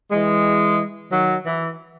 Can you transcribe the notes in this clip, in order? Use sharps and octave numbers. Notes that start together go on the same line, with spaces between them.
E3 G#3
D#3 F#3
E3